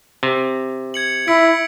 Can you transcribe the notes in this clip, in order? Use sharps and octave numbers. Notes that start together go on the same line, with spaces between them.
C3
G#6 C#7 F#7
E4 E6 B6 D7